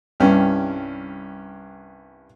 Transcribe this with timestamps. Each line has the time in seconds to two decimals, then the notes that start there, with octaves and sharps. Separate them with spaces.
0.20 C2 G2 C#4